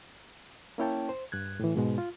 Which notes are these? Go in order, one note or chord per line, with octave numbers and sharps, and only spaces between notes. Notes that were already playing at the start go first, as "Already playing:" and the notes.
A#3 C#4 E4 C#5 G5 A5
C5
G2 F#6 G#6
A2 E3
G#2 B2 G#3
F4